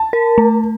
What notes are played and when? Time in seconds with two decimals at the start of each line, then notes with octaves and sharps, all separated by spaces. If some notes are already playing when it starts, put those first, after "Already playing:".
Already playing: A5
0.13 A#4
0.38 A3